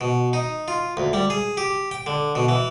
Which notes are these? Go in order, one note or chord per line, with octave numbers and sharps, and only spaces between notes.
B2
D#4
F4
D2
G3
G#4
G4
G5
D3
B2
E3